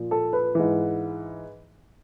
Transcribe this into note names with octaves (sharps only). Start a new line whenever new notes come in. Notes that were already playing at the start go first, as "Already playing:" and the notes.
Already playing: A#2 F3
A4
B4
G#2 E3